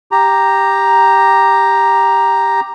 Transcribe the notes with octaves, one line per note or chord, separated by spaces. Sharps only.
G4 A#5